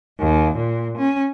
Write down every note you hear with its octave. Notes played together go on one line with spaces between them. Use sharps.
D#2
A#2
C#4